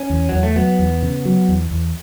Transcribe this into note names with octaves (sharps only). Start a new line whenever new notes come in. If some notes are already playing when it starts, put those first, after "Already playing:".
Already playing: C#4
E2
E2 F#3
A3
F#3 B3
E2
C#3
F#3
E2
E2